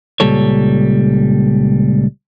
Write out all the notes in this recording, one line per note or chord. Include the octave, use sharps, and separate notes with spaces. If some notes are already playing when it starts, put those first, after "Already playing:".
C#2 A#2 G3 A4 C#5